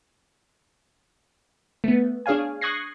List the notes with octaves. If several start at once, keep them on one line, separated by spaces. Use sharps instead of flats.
A3 B3
D4 G#4 C#5 F5 G#5
C#6 D#6 F#6 G#6 A#6 C7